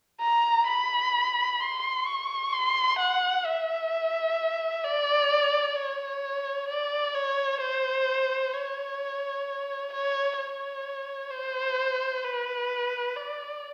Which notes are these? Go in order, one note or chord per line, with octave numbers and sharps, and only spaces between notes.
A#5
B5
C6
C#6
C6
F#5
E5
D5
C#5
D5
C#5
C5
C#5
C#5
C#5
C5
B4
D5